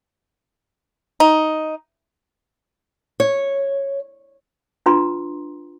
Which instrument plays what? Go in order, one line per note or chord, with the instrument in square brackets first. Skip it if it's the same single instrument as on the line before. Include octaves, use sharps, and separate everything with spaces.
[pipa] D#4
[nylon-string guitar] C#5
[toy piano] D4 F4 B4 G5 A#5 C6